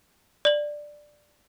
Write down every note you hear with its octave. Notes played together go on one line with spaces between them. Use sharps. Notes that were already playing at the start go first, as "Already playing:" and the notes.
D5 F#7